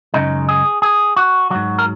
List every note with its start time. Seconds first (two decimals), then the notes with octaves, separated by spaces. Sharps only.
0.14 F#2 C#3 G#3 D#4
0.49 G#4
0.82 G#4
1.17 F#4
1.50 G#2 F#3 F#4
1.78 A#4